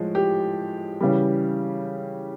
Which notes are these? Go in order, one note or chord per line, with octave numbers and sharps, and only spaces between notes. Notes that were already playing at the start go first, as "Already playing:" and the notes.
Already playing: A2 F3 G#3
G4
C#3 E3 G3